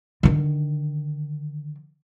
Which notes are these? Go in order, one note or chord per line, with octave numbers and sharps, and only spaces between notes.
D3 D#3